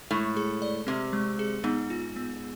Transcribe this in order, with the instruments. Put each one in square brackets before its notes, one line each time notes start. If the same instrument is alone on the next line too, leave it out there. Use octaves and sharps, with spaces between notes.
[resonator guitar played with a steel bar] A2 [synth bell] G#3
[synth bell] G#4
D5
[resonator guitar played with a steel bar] C3 [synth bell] C4
[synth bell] G#3
G#4
[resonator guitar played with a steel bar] G#2 [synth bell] B3
[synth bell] F4
B3